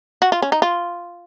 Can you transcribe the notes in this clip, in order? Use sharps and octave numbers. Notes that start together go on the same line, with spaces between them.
F#4
F4
C#4
D#4
F4